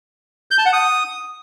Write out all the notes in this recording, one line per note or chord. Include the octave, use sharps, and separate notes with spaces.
G6
A5
F#5
D#6